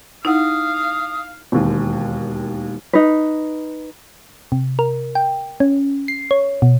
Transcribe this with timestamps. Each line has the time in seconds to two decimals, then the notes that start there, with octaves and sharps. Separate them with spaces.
0.25 D#4 E4 F5 F#5 D#6
1.52 E1 D#2
2.93 D#4 B4
4.52 C3
4.79 A#4
5.15 G5
5.60 C#4
6.08 C7
6.31 C#5
6.62 B2